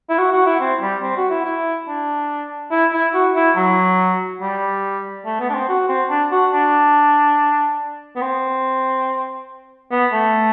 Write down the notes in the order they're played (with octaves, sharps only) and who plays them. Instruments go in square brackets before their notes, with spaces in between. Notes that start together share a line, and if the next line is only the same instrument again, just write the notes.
[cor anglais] E4
F#4
F#4
E4
C4
G3
C4
F#4
E4
E4
D4
E4
E4
F#4
E4
F#3
G3
A3
B3
D4
C4
F#4
C4
D4
F#4
D4
B3
C4
B3
A3